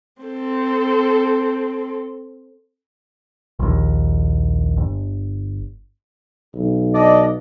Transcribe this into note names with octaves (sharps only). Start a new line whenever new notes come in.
C4 A4
A#1 D#2
G1
B1
D4 D5 D#5